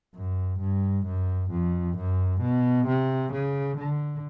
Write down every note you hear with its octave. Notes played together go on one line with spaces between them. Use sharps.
F#2
G2
F#2
F2
F#2
B2
C3
C#3
D3